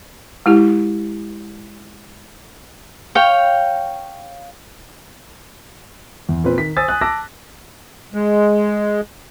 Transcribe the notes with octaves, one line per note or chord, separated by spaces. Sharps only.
G#3 E4 G4
C#5 F5 G5
E2
A#2 C4 B4
D#3 B6
C5 G#5 D#6 E6 A6
G#5 D#6 F#6
A5 D6 E6 A#6
G#3